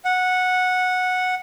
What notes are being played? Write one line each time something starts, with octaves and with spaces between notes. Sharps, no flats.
F#5